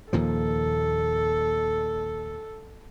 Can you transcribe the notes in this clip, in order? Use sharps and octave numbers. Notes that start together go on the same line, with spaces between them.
D#2 A#2 F3 A4